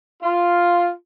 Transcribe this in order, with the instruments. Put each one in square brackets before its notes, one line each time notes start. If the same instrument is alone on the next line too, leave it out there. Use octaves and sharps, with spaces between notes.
[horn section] F4